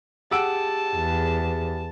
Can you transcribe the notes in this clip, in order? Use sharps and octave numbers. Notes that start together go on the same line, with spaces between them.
G4 G#4 F#5 A5 E6 D7
E2